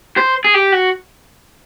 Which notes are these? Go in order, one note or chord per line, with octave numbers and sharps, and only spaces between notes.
C5
G#4
G4
F#4